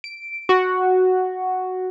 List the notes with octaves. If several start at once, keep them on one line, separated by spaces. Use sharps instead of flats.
D7
F#4